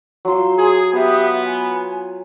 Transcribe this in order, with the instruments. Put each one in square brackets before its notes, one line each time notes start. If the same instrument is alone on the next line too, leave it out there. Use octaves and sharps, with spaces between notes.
[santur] F#3 F4 [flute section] C6
[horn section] G#4
[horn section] B3 [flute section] G4 E5 D#6
[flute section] G#5